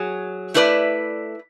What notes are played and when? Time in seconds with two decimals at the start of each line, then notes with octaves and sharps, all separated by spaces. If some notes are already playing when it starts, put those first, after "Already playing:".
Already playing: F#3 G#4
0.54 A3 E4 B4 D5